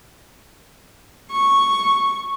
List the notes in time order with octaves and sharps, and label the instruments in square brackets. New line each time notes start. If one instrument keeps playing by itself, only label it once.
[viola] C#6